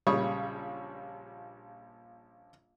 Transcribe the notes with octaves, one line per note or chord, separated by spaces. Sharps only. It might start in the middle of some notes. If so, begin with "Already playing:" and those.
A#1 C#3 G3 C#5 C#6 D#6